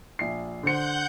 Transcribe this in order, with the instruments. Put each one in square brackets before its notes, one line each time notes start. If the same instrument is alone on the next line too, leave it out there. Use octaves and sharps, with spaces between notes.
[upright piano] A#1 E5 C7
[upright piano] D3 C5 C#7 [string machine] F#5 G6